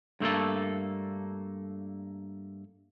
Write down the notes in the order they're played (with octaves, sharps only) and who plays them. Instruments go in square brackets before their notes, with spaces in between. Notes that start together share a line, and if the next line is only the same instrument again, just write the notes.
[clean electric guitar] G2 A3 A#3 A4